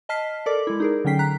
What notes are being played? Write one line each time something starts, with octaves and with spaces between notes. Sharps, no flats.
D#5 A5 F6 B6 C7
A4 A#4 D5 D6
G#3 E4
D#4 G#4 A#4
D3 F#3 C#4 G5 B6 C7
A#5 F#6 B6